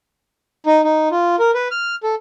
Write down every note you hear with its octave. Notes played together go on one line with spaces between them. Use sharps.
D#4
D#4
F4
A#4
B4
F6
A4